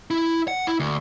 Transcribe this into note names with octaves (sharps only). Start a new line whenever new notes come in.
E4
F#5
E4
D2